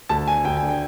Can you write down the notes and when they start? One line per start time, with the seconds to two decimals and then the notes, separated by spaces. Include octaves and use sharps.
0.09 D2 A5
0.27 D3 G#5
0.45 D2 G5
0.57 G#5
0.63 D3
0.68 G5